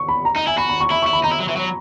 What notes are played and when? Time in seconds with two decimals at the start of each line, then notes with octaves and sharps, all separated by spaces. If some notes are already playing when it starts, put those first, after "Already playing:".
Already playing: C#6
0.09 B5
0.25 A#5
0.35 D#4 A#5
0.47 E4 G#5
0.58 F#4 B5
0.69 B5
0.80 C#6
0.91 E4 B5
1.02 C#6
1.07 E4
1.13 B5
1.24 D#4 A#5
1.32 E4
1.40 F#3
1.48 E3
1.57 F#3